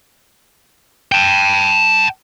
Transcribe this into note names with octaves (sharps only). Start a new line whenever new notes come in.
G5 A5